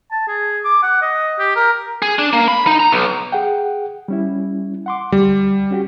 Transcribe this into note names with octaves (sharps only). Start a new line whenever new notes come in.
A5
G#4
D6
F#5
D#5
G4
A#4
G#4
D4
A#3
B5
D#4
A#5
B1
G#4 F#5 G5
G3 C#4 E4
F#5 C6 D6
D2 G3
C#4 F#4 G4